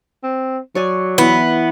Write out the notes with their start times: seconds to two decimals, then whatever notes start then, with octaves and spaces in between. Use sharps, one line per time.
0.23 C4
0.75 F#3 C#5 D5 G#5
1.18 E3 B3